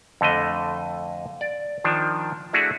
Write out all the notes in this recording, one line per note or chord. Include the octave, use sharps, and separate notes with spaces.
F2 D3 A3 D#5
D5
D#3 F3 D4
A3 D4 E4 F#4 G#4